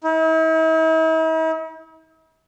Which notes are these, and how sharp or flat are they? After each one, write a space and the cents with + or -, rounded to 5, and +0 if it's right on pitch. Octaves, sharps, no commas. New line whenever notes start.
E4 -45